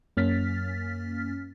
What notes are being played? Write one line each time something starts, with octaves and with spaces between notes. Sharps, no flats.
F#2 A#3 C#4 F6 A6 B6